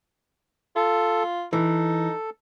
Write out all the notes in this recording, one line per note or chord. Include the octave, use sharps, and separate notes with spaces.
F4 A4
E3 D#4 A4